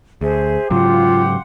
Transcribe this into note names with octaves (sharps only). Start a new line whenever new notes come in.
D2 G#4 C5 E5
G#2 C#3 F#3 F4 G4 F5 F#5 C6